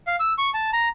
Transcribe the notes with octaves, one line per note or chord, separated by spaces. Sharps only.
F5
E6
C#6
A5
A#5